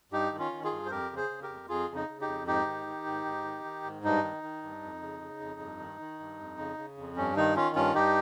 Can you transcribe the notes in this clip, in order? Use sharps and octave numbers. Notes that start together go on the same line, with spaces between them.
G2 D#4 G4
D#3
C#4 F4
D#3
F4 G#4
G2
C5
F2 G4 A#4
C#3
G#4 C5
C#3
G4 A#4
F2
F2 F4 G#4
C#3
D#4
C#3
D#4 G4
F2
G#2 D#4 G4
D#3
D#3
G#2
G#2
D#3
D#3
G#2
G2 D#4
D#3
D#3
G2
F2
C#3
C#3
F2
G2
D#3
D#3
G2
F2
C#3
C#3
F2
G2 C#4
D#3 D#4
D#3 C#4 F4
G2 C#4 F4
G2 D#4 G4